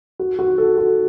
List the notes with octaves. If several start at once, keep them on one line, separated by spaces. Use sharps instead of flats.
F#4
F#4
A4
F#4